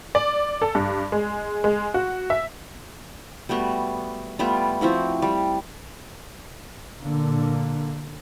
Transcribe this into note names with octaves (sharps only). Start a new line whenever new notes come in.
D5
A4
G2
G#3
G#3
F#4
E5
G3 A3 B3 F#4
G3 A3 B3 F4
F3 C4 E4 F#4
G3
A#2 D3 A#3